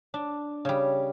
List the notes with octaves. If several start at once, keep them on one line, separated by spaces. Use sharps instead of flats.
D4
C#3 G3